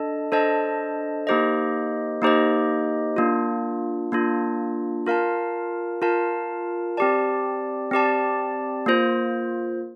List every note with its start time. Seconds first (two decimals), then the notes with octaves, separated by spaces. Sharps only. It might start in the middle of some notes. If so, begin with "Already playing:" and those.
Already playing: D4 A4 D#5 A5
0.32 D4 A4 C5 D#5 A5
1.27 A#3 D#4 G4 C5 D#5
2.22 A#3 D#4 G4 C5 D#5
3.16 A#3 D4 F4
4.12 A#3 D4 F4
5.06 F4 A#4 F5 A5
6.02 F4 A#4 F5 A5
6.97 C4 G4 D5 A5
7.91 C4 G4 D5 A5
8.86 A#3 F4 C5